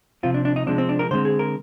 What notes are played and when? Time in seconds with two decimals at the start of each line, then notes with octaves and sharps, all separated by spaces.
0.23 C3 F3 C4 F4
0.34 D4
0.45 D4
0.56 D#4
0.66 C3 F3 G#3 C4 D4
0.78 C4
0.89 D4
0.99 A#4
1.11 D3 G#3 C4 C5
1.25 G#4
1.39 A#4